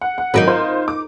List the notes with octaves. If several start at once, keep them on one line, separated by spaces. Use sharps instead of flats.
F#5
F#5
G#1 F#3 D#4 A#4 B4
F4 C5
D6